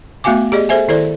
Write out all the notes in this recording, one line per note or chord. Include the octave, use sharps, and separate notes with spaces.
A3 B3 F#4 F5 G#5 D6
G4 G#4 D5 D#5
G#4 A4 C5 E5 G#5
D#3 E4 A4 C5 D5